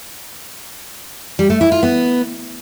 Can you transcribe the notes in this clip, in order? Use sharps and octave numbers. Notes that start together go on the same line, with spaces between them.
G3
A3
E4
F4
B3